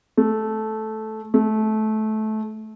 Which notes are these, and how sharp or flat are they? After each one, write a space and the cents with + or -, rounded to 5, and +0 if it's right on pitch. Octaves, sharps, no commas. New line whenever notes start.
A3 -10
A3 -20